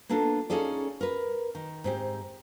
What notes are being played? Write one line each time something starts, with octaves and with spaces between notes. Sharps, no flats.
A#3 B3 D4 F4 A4
C#4 D#4 F4 G#4 A4 D5
A#4 B4
D#3
G#2 C4 G4